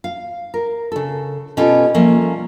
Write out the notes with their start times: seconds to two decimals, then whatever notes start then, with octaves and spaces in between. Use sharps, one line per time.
0.04 F5
0.54 A#4
0.92 C#3 A4
1.57 B2 C#4 F4 G4 A4
1.94 F3 G3 A3 A#3 C#4